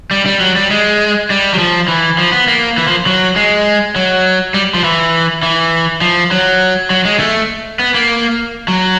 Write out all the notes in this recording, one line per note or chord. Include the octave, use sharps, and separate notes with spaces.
G3
G3
F#3
G3
G#3
G3
F#3
F3
E3
F3
B3
A#3
E3
F3
F#3
G#3
F#3
G3
F3
E3
E3
F3
F#3
F#3
G#3
A3
B3
A#3
F#3